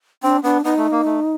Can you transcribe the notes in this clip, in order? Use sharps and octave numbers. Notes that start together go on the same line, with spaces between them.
C4 D4
B3 D4
B3 D#4
A3
A#3
A3